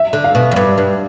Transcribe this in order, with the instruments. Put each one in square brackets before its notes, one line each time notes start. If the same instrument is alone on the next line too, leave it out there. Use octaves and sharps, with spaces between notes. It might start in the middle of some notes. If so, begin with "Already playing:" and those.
Already playing: [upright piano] E5
[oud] D3
[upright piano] F5
[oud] B2
F2
G2
G2